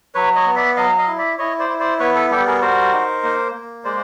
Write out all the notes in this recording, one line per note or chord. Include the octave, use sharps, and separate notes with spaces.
F#3 B4 C#5
C#5 D#5
B3
D5 E5
F#3 D#5 F5
D#5 F5
E4
D5 E5
E4 C#5 D#5
C5 D5
E4
C5 D5
B3 B4 C#5
A4 B4
G3 G4 A4
G#4 A#4
F#4 A#4 C5
D#4
A#3
A#3
G#3 C5 D5